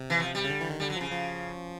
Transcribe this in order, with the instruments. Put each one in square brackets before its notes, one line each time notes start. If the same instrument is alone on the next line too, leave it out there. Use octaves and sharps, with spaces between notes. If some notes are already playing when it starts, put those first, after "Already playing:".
Already playing: [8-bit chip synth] C3
[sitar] E3
F3
G3
[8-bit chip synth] C#3
D3
E3
D#3
[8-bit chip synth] D3 [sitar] G3
[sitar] F#3
[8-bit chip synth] F3
[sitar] C#3
[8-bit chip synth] F3